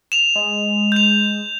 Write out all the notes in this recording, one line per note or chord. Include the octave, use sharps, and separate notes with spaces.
E7 F7
G#3
G6 F7